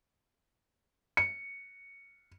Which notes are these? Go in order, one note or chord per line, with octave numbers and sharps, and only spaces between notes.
C#7